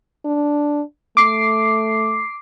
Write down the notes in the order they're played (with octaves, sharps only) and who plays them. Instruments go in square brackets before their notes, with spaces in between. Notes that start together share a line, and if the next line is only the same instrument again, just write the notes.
[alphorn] D4
[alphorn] A3 [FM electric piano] D6 C7